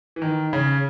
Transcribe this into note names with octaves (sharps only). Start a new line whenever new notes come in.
E3
D#3
C#3